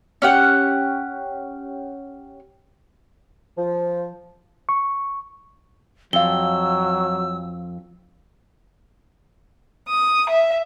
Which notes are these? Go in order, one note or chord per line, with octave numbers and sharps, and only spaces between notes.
C#4 G4 F#5
F3
C#6
F2 F#3 F5 E6 G7
D#6
E5